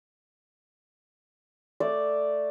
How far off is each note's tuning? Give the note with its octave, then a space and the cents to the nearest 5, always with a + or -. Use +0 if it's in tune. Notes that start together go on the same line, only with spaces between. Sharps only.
A3 +5 D5 +0